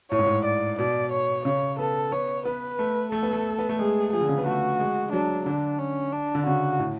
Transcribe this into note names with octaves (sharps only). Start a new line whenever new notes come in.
A2 C#5
G#2
A2
D5
B2 D5
C#5
C#3 C#5
B3 A4
B3 C#5
B3 B4
A3
A3 A4
B3
A3
B3
A3
G#3 G#4
F3 G#4
D3
C#3
B3
A3 F#4
G#3
F#3 D4
D3 D4
C#4
D4
D3
C#3 F#4
A2